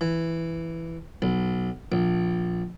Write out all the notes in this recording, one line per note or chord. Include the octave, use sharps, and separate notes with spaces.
E3
B1
A#1